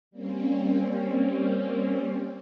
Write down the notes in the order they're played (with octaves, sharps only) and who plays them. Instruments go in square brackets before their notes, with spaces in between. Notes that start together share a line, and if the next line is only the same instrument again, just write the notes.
[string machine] G3 A#3 C4 C#4